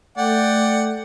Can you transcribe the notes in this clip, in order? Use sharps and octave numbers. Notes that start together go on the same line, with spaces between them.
A3 D5 F#5 G5